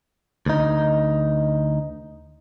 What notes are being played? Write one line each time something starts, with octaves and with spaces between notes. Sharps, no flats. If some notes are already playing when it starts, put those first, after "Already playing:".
D2 D#4